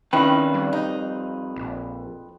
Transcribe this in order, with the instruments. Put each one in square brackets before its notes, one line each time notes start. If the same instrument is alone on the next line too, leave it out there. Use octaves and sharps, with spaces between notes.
[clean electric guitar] F2 B4 [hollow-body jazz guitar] D#3 C#4 E4 [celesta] G5 B5
[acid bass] G3
[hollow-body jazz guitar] D#4
[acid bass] A#1